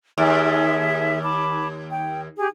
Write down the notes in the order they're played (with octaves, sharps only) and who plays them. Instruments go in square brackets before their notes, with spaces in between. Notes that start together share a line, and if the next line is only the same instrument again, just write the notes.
[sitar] D#2 [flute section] G#4 E5
[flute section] A5 B5 D6
G5
G4 G#4